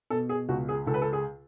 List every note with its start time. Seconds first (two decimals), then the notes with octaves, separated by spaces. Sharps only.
0.10 B2 A4
0.29 G#4
0.49 C#2 F#4
0.69 G#4
0.87 C#2 A4
0.94 B4
1.02 A4
1.13 G#4